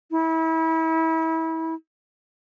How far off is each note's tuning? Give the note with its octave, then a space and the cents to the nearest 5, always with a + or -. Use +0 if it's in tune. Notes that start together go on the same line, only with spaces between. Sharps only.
E4 -30